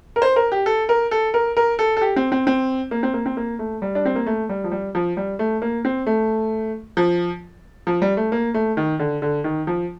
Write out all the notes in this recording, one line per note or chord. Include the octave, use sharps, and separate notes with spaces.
A#4
C5
A#4
G4
A4
A#4
A4
A#4
A#4
A4
A4
G4
C4
C4
C4
A#3
C4
A#3
C4
A#3
A3
G3
D4
C4
A#3
A3
G3
F3
G3
F3
G3
A3
A#3
C4
A3
F3
F3
G3
A3
A#3
A3
D#3
D3
D3
D#3
F3